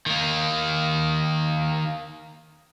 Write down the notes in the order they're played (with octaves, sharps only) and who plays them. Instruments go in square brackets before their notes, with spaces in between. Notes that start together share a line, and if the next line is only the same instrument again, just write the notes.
[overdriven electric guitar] D#3 A#3